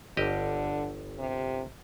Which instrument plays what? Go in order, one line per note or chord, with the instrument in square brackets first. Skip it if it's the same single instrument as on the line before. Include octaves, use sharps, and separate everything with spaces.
[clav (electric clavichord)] G1 G4 D#5 [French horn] D3
[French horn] C3